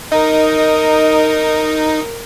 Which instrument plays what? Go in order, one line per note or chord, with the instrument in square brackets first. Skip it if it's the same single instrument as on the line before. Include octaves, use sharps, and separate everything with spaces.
[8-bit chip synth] D#4 [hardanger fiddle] A#4 [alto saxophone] D#5